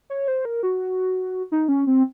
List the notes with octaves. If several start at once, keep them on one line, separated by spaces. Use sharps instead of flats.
C#5
C5
A#4
F#4
D#4
C#4
C4